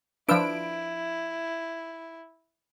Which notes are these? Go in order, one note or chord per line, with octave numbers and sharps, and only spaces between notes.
F3 D4 E4 B4 E6 D7